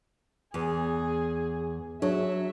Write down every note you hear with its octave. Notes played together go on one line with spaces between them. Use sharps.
E2 G#4
F#3 D4 G#4 C#5 E5